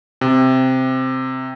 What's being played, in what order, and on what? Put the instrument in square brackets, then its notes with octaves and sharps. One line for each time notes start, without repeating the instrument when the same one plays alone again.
[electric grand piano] C3